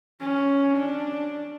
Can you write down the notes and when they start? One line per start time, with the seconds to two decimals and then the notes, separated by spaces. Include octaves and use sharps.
0.21 C#4
0.78 D4